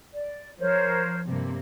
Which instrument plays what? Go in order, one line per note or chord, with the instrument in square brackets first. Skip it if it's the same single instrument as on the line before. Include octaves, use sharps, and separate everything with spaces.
[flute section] D5
[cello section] F3 [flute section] A#4 C5 C#5
[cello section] G2 C3 A#3